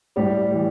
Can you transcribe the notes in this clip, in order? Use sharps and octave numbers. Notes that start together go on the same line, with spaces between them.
A2 G3 G4
E3 G3